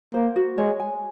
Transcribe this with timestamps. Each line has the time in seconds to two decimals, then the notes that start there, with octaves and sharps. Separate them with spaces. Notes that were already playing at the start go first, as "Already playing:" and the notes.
0.14 A#3 C5
0.36 F#4
0.58 G#3 C#5
0.80 G#5